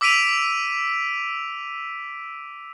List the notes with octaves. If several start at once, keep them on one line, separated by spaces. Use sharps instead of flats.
D6 E6 B6 D7 D#7 F7